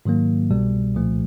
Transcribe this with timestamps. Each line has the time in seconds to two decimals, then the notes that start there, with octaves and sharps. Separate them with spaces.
0.05 G#2 D#3 F#3 A#3
0.51 C2 B2 G3
0.95 C2 A#2 F3 A3